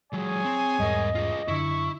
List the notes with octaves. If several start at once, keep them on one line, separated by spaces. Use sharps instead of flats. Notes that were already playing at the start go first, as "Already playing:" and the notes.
F#3 G#3 G#4 C#5 G#5
C4
E2 G#2 G3 A#4 D#5
F4 G#4
F#2 D3 E4 C#6